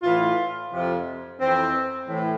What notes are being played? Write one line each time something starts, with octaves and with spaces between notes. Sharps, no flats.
A2 E3 F4
F2 C3 F3
F2 E3 C4
A2 E3